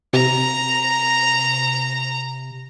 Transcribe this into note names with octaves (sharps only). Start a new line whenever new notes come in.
C3 A#5